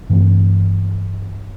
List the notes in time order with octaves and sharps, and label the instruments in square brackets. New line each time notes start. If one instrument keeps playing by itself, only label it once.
[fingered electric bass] G2 E3 A3 C4